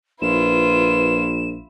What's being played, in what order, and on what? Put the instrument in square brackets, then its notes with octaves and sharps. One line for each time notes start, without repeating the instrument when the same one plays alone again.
[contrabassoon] A#1 [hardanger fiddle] E4 F4 [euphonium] B4 [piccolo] E7